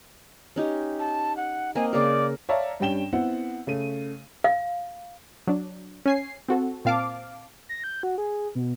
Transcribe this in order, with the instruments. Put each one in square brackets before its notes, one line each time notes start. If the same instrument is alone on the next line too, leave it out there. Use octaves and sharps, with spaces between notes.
[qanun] C#4 D#4 G4
[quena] A5
F#5
[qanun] A#3 C4 D#5 [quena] G#5
[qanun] C#3 A#3 A#4 [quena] D5
[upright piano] C#5 D5 E5 F5 A5 A#5
G2 G3 C#4 G5 E7 G7
B3 C4 E4 F#5
C#3 A3 D#7
[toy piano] F5
[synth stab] F#3 D4
C#4 G#5 C7
C4 F#4 A4
A#2 C4 F5 A5 D6
[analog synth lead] A#6
G6
F#4
G#4
B2